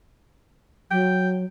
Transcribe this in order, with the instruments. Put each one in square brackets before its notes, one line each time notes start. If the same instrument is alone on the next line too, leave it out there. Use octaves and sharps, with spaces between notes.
[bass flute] F#3 [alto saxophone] G5